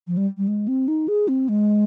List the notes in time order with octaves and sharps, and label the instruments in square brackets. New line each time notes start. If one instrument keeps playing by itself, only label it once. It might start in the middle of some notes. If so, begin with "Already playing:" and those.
[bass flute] F3
G3
G3
G#3
C4
D#4
G#4
C4
G#3